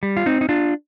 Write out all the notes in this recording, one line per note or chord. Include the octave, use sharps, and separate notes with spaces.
G3
F4
C4 D#4
D#4
D4 F4